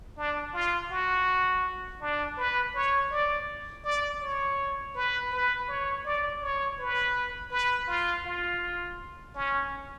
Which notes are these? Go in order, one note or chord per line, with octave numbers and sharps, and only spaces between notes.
D4
F4
F#4
D4
B4
C#5
D5
D5
C#5
B4
B4
C#5
D5
C#5
B4
B4
F4
F4
C#4